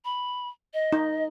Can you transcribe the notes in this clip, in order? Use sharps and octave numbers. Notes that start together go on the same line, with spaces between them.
B5
D#5
D#4